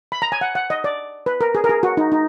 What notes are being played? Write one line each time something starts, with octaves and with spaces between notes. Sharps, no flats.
B5
A#5
G#5
F#5
F#5
D#5
D5
B4
A#4
G#4
A#4
G#4
F#4
D#4
D#4